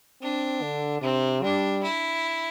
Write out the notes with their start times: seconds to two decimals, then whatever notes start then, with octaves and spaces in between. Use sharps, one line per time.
0.22 C4 D4
0.63 D3
1.02 C3 C4
1.43 G3 D4
1.83 E4